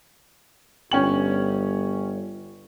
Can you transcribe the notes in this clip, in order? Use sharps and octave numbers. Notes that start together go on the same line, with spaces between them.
G1 C#4 G5 F#7